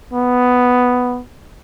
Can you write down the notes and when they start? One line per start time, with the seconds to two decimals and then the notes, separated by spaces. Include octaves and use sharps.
0.13 B3